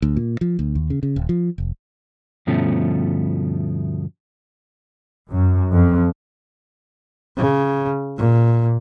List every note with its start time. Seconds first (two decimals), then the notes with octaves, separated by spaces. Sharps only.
0.02 D2
0.16 A#2
0.41 F3
0.59 D2
0.75 D#2
0.90 C#3
1.03 C#3
1.16 D#1
1.29 F3
1.58 F1
2.47 D2 G2 B2 F3 A3 C#4
5.30 F#2
5.73 F2
7.37 C#3
8.18 A#2